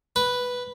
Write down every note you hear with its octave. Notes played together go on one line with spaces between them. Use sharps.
B4